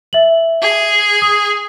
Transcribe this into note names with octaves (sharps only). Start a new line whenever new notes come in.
E5 F#7
G#4
D#6